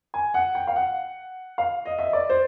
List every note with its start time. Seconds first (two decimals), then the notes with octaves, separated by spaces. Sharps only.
0.14 G#5
0.34 F#5
0.55 G5
0.67 F5
0.76 F#5
1.58 F5
1.86 D#5
1.99 E5
2.06 D#5
2.13 D5
2.30 C5